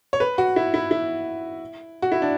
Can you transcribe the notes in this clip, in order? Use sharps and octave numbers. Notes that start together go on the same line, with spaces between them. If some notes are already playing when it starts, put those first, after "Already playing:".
C#5
B4
F#4
E4
E4
E4
F#4
E4
D4